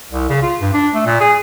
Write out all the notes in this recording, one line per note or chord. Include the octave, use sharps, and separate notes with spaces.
C2
C#3
F4
G2
D4
A3
A#2
G#4